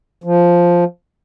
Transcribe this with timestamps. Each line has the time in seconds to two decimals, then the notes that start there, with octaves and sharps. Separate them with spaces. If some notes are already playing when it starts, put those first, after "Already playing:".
0.24 F3